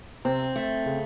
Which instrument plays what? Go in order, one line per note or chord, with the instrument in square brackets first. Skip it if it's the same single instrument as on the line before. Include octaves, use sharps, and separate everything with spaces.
[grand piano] C3 [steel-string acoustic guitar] C4
[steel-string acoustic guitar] A3
[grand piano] C#3